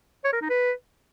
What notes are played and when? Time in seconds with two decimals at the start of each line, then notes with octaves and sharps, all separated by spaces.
0.24 C#5
0.33 A#4
0.41 D#4
0.50 B4